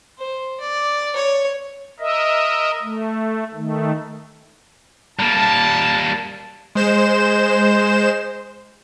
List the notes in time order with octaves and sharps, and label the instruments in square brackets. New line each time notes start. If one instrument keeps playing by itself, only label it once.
[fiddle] C5
D5
C#5
[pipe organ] A#4 D#5 E5
A3
D#3 A3
[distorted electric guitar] G3 A#3 [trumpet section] A5
[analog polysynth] G#3 C5 E7